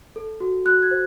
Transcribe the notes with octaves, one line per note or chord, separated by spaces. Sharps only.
A4
F#4
F#4 F#6
G#6
C5